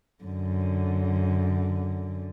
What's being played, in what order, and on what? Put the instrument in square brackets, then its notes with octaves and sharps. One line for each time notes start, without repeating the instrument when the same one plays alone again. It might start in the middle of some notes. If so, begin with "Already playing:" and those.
[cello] F#2 D3